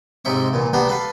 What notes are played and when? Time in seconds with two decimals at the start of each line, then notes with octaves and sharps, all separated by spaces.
0.25 G#2 C3 D#4 E5 C#6
0.53 E2 A#2
0.73 B3 D4 F#4 G4 G#5 A#5
0.88 A4 B4 F5